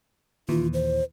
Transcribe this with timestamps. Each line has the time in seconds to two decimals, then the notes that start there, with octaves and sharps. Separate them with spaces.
0.49 D#2 A#2 E3 F4
0.74 C5